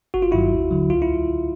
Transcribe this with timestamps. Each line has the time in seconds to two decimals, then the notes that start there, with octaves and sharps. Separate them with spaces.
0.14 G1 F#4
0.22 F4
0.31 G2 D#3 F#3 E4 F#4
0.52 D#2
0.70 D3 F#3
0.90 C#2 F4
1.02 E4